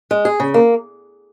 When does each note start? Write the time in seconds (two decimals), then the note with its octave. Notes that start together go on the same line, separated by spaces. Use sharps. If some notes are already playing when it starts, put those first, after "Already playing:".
0.11 G#3
0.25 G#4
0.40 C#3
0.54 A#3